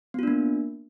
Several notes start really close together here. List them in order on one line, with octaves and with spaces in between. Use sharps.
B3 F4 D4 A#3